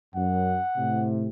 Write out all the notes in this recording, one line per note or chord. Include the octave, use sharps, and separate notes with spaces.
F#2 F#5
A2 C3